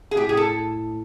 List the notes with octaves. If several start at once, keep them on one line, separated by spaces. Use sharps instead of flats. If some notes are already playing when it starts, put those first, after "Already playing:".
G#4
A2 G4
G#4
A4